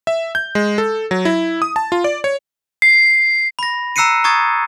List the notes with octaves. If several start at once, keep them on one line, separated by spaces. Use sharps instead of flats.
E5
G6
G#3
A4
F#3
E4
D#6
A5
F4
D5
C#5
C7
B5 A#6
A#5 E6 F#6 C7 C#7 D#7
A#5 C#6 D#6 G#6 A6